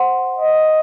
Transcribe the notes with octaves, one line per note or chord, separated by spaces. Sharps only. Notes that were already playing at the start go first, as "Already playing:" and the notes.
Already playing: C5 F#5 C6
D#5